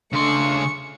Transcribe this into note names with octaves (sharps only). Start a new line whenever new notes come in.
C#3 A3 D4 C6 C#6